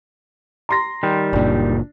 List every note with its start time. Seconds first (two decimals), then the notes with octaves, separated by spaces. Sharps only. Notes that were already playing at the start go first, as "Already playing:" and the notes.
0.69 A#5 C6 A#6
1.03 D#3 G3
1.33 F#1 A#2 D4